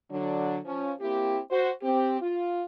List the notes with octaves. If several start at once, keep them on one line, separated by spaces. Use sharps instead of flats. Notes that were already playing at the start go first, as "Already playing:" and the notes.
D3 F#3 D4
F3 C#4
A#3 C4 E4 G4
F#4 C5
C4 G4
F4